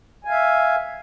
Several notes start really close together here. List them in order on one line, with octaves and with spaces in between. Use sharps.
G#5 F5 E5